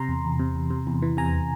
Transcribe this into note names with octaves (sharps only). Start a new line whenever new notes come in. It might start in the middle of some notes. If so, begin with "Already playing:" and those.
Already playing: C3 A#5 C6
E2
E2
C3
E2
C3
E2
E3
C3 G#5 A#5